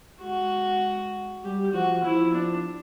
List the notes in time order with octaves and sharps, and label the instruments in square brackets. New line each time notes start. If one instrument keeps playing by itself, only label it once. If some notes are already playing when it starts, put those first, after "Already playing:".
[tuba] G#3 [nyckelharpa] F#4
[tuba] G3 [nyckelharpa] G4
[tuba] F3 [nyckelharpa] F#4
[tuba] F3 [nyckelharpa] E4
[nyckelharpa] D4